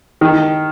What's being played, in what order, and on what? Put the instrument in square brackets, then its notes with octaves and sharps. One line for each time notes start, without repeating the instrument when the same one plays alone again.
[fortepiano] D#3